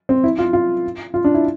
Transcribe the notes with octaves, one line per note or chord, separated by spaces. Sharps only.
C4
E4
F4
F4
F4
D4
E4